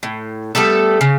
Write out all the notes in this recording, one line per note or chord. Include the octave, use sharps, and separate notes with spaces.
A2
G3 A3 B3 A4
C#3